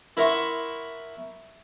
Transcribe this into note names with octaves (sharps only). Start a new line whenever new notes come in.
E4 A#4 E5 F#5 C6 C#6